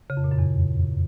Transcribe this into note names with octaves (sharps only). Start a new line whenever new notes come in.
C#3
F2
A#2
F#2
E2